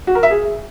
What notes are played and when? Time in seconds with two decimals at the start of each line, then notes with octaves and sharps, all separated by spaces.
0.07 F#4
0.15 A#4
0.23 E5
0.31 G#4